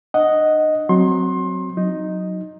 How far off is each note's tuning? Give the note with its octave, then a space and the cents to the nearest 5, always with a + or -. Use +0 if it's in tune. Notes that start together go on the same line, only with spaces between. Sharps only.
D4 +35 D#5 +0 F#5 +0
F#3 +0 C4 -5 C6 +25
F#3 -10 D#4 +0